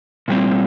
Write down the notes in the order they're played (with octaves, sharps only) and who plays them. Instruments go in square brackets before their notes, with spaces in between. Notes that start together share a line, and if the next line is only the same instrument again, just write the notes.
[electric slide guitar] A#2 G3 C4